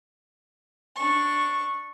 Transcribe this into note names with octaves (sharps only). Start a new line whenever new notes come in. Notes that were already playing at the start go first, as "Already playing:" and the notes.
D4 C#6